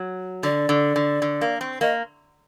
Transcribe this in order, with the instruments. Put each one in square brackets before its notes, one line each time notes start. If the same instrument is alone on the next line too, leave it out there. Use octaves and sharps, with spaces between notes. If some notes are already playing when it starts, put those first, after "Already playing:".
Already playing: [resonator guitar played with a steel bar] F#3
[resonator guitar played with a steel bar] D3 [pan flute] D5
[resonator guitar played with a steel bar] D3
D3
D3
A#3
C4
[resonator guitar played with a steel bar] A#3 [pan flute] D#5